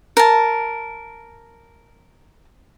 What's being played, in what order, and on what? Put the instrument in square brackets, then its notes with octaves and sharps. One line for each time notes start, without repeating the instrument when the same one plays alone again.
[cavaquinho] A#4 A5